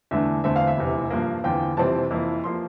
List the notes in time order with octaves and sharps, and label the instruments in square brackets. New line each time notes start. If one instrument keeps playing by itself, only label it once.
[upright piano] E2 D3 A3 D4 E5
E2 D3 A3 C4 E5
F5
E5
F1 E2 C3
G2 F3 A#3
E2 D3 F3 C4 F4 G5
F2 C3 E3 G3 C4 A5
F2 E3 A#3 E4
F3 A#3 C6